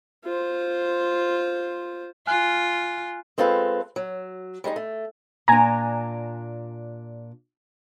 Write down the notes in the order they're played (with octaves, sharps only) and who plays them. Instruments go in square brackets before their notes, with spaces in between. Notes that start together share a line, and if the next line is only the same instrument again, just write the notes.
[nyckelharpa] F4 C5
[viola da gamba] F4 [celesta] G#5 F6 F#6
[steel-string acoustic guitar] G#3 C4 F4 A4 B4
F#3
G3 G#3 D4 D#4
A3
[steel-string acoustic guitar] A#2 D4 [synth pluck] G#5 A#5